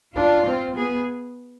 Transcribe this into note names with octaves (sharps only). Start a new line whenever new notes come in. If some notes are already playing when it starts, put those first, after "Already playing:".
D4 F4
C4
B3 G#4